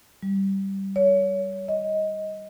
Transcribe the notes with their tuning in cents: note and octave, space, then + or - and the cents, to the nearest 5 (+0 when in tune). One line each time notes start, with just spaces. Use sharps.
G3 -10
C#5 +25
D#5 +15